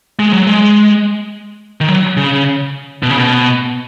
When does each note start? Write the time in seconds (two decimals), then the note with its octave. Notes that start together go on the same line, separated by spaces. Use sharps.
0.19 G#3
0.33 F#3
0.47 G#3
1.81 D#3
1.88 F#3
2.17 C#3
3.03 B2
3.10 C#3
3.18 B2